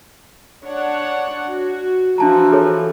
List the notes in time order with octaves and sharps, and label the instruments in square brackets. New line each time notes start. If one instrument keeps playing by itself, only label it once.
[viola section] D4 C#5 F#5
F#4
[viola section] E3 F3 F#4 [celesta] D4 A5 A#5
[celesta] G#4 A4 C#5